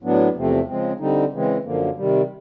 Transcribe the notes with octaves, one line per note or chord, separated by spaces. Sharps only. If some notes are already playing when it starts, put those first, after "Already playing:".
A2 F#3 B3 D4
E2 C3 F3 A3 C4
C#3 F3 G#3 C4
D3 G3 C4 D#4
C#3 E3 G#3 C4
F#2 D3 F3 A#3
C3 D#3 G3